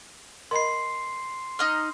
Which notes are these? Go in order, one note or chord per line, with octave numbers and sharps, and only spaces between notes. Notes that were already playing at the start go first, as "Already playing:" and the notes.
A#4 D#5 B5 C6 C7
D#4 D#5 F6